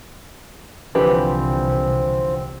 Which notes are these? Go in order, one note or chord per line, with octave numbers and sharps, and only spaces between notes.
C2 D3 E3 F3 C4 G4 B4